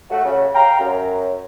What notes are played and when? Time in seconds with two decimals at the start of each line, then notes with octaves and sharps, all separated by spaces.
0.10 A3 F#4
0.25 C#3
0.55 F5 G5 A#5
0.79 F#2